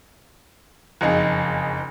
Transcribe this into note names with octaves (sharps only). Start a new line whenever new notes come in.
F#1 F2 D#4 G#4